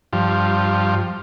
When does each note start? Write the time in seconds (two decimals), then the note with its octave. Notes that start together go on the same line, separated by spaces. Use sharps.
0.13 G2 F3